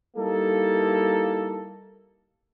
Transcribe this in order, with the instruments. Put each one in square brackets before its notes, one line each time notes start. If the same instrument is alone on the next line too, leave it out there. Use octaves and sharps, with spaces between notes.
[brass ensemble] G3 A#3 D#4 E4 A4